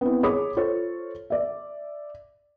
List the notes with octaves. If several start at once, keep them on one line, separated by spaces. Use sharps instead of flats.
B3 C4 E4
G#4 C#5 B5 D6 D#6
F4 A4 C5 C#5
D5 E5